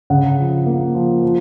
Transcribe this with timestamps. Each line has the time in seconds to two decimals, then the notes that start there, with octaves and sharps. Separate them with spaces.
0.10 C#3 F#5
0.38 F3
0.66 A#3
0.94 F3
1.23 F3